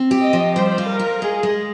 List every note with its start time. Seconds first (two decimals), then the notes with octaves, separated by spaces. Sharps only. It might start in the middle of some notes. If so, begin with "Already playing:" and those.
Already playing: C4
0.11 G4
0.22 D#5
0.33 F3
0.55 G3 C5
0.78 F4
0.88 A#4
0.99 F4
1.21 G#3 G#4
1.43 G#3